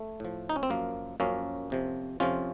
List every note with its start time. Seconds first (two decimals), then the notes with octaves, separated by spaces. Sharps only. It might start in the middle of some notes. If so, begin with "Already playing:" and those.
Already playing: A3
0.20 A2 F3
0.49 D#4
0.56 C#4
0.63 C4
0.70 F#2 F3 A#3
1.20 F#2 F3 A#3 C#4
1.70 F2 C3 F3
2.20 F2 C3 F3 C#4 F4